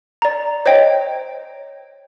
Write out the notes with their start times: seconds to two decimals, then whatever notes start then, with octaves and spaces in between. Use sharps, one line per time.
0.22 D5 A#5
0.66 C5 C#5 D#5 G5